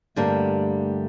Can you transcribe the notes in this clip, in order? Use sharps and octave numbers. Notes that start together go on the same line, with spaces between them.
G2 D3 G3 A3 A#3